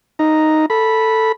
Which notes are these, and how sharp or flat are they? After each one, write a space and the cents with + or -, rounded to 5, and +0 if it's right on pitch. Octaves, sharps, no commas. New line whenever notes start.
D#4 +0 A#5 +0
A4 +5 B5 -10